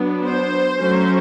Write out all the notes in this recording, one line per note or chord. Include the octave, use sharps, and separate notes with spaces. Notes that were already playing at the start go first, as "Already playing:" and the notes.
Already playing: F#3 B3 D4
C5
F#3 A3 C#4